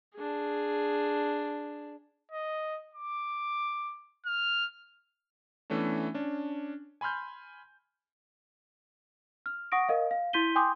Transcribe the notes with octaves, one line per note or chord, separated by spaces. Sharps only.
D4 G#4
D#5
D6
F6
E3 A3 B3 C#4 D4
C#4 D4
G#5 B5 C6 F6 G6
F6
F#5 C#6 D#6 A#6 D7
A#4 D#5 F5
F5
E4 C6 G6 B6 D#7 G7
G5 G#5 C6 D6 D#6 G6